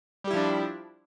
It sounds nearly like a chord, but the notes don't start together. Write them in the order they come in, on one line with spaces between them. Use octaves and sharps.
G3 G4 E4 F3 D4